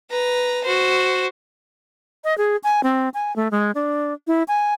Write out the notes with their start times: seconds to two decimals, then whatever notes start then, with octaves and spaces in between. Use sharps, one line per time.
0.10 B4 A#5
0.64 F#4 C5
2.24 D#5
2.38 G#4
2.64 G#5
2.83 C4
3.14 G#5
3.36 A3
3.51 G#3
3.75 D4
4.27 E4
4.48 G#5